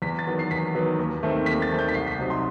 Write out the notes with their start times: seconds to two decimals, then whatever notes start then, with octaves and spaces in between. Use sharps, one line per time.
0.02 E2 B6
0.19 A6
0.26 D#3 F#3 B3
0.39 C7
0.51 E2 B6
0.75 D#3 F#3 B3
0.99 D#2
1.23 D#3 A3 C4
1.46 D#2 B6
1.62 A6
1.71 D#3 A3 C4
1.79 G6
1.88 B6
1.94 C2 C7
2.07 B6
2.19 C3 F#3 C4 D#4
2.30 C6